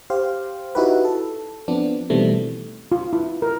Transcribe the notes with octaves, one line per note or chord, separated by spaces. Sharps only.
G4 C5 F5
D#4 E4 F#4 G4 B4
A4
F3 B3 C4 D4
B2 D#3 E3 G3 A3 C4
F4
E4
A#4